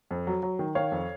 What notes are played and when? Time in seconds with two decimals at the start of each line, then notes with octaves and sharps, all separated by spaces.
0.11 F2
0.27 F#3
0.43 F#3
0.59 D#3
0.75 D#3 C#5 F5
0.92 F2